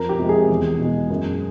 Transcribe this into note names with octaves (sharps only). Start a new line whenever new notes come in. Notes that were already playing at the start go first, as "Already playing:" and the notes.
Already playing: F2 A#4
G4
C3 F3 G#3
G#4
E2
B2
G#3
F#2